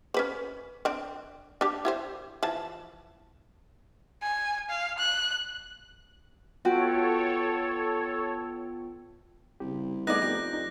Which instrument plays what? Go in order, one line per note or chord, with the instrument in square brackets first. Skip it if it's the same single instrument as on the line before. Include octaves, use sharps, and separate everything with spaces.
[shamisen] C#4 B4 C5
C4 D4
D4 G4
E4 G4 C5
E3 F3 A5
[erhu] G#5
F5
F#6
[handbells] B3 F4 G5 [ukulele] F#4 [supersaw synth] A4 C#5
[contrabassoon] C2 [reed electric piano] C#3 G4
[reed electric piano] A3 B3 [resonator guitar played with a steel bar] D#4 G#4 D5 [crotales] F#6 A#6
[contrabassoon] F2 [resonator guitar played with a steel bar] G4
[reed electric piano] D#4